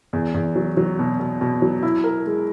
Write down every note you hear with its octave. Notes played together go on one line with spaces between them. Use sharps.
E2
E2
F#3
F#3
B2
B2
B2
F#3
E4
A#4
G#3